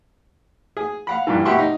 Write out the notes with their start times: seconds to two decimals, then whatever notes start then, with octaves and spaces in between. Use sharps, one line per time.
0.77 G#4
1.07 F5 F#5 B5
1.27 G2 A#2 E3
1.45 B2 G4 E5 F#5 C6 C#6
1.59 D#4